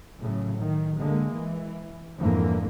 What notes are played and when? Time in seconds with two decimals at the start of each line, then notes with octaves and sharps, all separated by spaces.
0.20 A2 C#3 F#3
0.59 D#3
0.98 D3 G#3 A#3
1.34 E3
2.17 F2 G#2 D3 E3 A#3